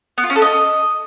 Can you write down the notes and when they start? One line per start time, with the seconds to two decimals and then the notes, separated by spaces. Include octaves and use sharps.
0.18 B3
0.24 F4
0.30 C#4
0.36 A4
0.42 D#5